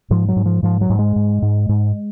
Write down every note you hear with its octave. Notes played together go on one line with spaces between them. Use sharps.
G#2 F3
F#3
G#2
F3
G#2 F3
F#3
G#2
G#3
G#2
G#2
G#2